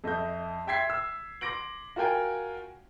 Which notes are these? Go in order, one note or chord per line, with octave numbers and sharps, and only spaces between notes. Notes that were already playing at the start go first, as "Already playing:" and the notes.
F2 D#5 E5 G6
E5 G5 C6 G#6 B6 C7
E6
C6 D6 A#6 D7 F#7
F4 F#4 A#4 G5 G#5